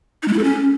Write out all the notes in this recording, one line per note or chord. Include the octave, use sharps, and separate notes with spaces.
D#4
G#3
E4
A4
C#4